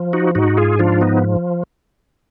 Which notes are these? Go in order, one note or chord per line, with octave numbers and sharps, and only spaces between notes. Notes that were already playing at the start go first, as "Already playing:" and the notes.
Already playing: F3
D#4 F#4
G#2 D#4 F#4
F4 G#4
F3 D4 F4
B3 D#4